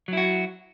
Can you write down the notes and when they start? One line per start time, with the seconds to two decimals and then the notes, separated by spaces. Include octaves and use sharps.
0.08 F#3
0.13 E4
0.17 F#4